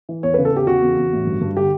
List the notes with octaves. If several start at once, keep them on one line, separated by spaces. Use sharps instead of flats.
E3
E2 C#5
C#3 B4
A4
E2 G4
C#3 F#4
E2
E2
A1
G2
G2
D3 G4